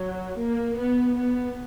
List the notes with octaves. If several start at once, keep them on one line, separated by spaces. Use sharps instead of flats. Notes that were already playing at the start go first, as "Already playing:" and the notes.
Already playing: F#3
A#3
B3
B3